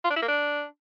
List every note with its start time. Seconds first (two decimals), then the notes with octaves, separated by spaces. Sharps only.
0.04 F4
0.10 D4
0.16 E4
0.22 A#3
0.28 D4